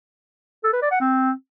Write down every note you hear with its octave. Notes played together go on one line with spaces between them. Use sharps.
A4
B4
D5
F#5
C4